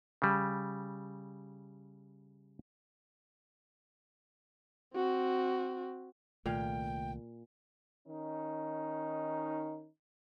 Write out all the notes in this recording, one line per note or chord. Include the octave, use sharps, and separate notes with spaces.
C#3 G3
C4 F#4
C2 A#2 D#3 A3 F5 G5
D#3 C#4 D#4